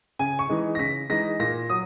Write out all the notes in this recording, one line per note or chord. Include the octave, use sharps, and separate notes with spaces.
C#3 G#5
C#6
E3 G#3 D#4
A#6
C#3 B6
E3 G#3 D#4 A#6
A#2 A#6
F#3 D#6